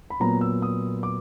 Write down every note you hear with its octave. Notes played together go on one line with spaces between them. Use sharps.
B5
A#2 F#3 B3 A#5
E6
D#6
D6